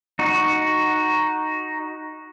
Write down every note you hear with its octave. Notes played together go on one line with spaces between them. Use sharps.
D#4 F#4